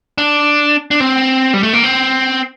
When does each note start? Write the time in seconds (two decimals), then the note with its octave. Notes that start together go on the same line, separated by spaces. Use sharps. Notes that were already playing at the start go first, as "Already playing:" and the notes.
0.18 D4
0.91 D4
1.00 C4
1.54 G3
1.63 A3
1.73 A#3
1.83 C4